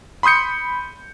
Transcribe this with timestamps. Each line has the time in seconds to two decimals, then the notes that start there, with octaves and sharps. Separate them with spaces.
0.23 B5 C6 D#6 G6 C#7